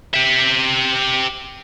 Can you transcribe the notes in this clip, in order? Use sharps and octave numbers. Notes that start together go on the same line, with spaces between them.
G4 E5